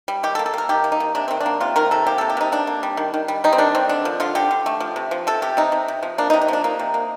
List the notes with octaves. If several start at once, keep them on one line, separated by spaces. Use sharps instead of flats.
G3
D#3 G4
A4
A#3
A4
A#3 A#4
D#3 G4
A#3
D#4
D#3
C3 D4
D#3 C4
D4
A#3
C3 F4
D#3 A#4
C3 A4
A#3 G4
C3 A4
G4
C3 D#4
A#3 D4
A#3
G3
D#3
D#3
G3
G3 D#4
C4
D#3 D4
D#3 C4
D3 D4
F3
D3 F4
D3 G4
D3
A3
F3
C3
F3
C3 A4
C3 G4
C3 D#4
C3
C3
F3
A#3 D4
D#4
C3
D#4
F3 D4
A#3 D#4
C3
A#3